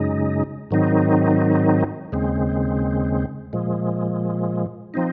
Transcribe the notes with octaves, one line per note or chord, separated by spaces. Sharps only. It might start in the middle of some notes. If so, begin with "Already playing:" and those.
Already playing: F#2 C#3 G#3 D#4
G#2 D#3 F#3 C4 D#4
D#2 C#3 G#3 C4
A#2 F3 G#3
F3 C4 D#4